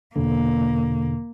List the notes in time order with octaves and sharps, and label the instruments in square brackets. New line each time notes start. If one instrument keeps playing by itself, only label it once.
[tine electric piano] E2 B2 D3 [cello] A#3